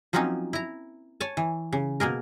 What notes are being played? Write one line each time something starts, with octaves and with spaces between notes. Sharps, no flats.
F3 F#3 A#3 C4 C#4 D#4
E4 A#5
C#5 G#5 A5
E3
C#3
B2 A#3 G#4 A#4